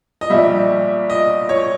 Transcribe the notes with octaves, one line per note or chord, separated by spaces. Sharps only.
D#5
A#1 A#2 G3 E5
D#5
C#5